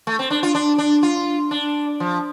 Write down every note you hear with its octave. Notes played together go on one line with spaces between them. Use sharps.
A3
C4
D4
F4
D4
D4
F4
D4
F3